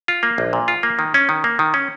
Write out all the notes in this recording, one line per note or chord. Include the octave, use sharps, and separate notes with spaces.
F4
A#3
A#1
A#2
F4
A#3
D#3
C#4
D#3
A#3
D#3
C#4